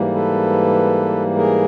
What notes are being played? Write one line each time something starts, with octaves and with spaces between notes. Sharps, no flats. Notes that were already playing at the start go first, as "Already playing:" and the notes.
Already playing: G#2 E3 G3 A#3
A4 B4
G#4 A#4